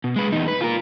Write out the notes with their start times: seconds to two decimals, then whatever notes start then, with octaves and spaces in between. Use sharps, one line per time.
0.04 B2
0.16 G#3 B4
0.32 E2 D#4
0.48 B4
0.61 F4 A#4